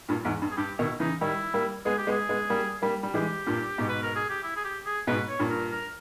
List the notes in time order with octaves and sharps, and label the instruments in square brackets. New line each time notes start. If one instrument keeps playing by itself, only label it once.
[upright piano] G2 A#2
E2 G#2
G2
[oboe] G#4
[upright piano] G2 [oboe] G4
[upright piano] B2 D#3 [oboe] E4
[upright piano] C#3 E3 [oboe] D#4
[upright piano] D#3 G3 [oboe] E4
[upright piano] G3 A#3
[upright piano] G#3 B3 [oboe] G#4
[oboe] G4
[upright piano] G#3 B3
[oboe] G#4
[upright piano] G#3 B3
G3 A#3
G3 A#3
G3
[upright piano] E3 G#3 [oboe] G4
[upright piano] G2 A#2
G#2 B2
[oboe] B4
A#4
G#4
G4
E4
G#4
G4
G#4
[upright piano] G#2 B2 [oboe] B4
[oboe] C#5
[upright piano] G2 A#2
[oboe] A#4
A#4